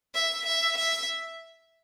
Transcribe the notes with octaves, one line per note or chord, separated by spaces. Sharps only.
E5
E5
E5